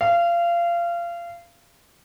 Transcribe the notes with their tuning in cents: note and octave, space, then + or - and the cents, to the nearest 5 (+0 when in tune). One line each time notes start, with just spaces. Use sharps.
F5 -25